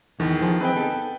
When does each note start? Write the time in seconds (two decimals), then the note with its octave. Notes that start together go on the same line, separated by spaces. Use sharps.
0.20 E2 D#3 E3
0.41 F3 G#4 A4
0.61 C4 D#4 G#4 B4 G5
0.75 B3 D#4 A4